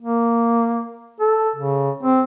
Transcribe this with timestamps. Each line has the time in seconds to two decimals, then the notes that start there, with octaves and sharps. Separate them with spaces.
0.01 A#3
1.21 A4
1.56 C#3
2.03 C4